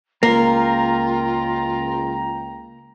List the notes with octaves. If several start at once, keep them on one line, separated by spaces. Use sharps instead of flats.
C#2 A#3 F4 A#4 G5 A#5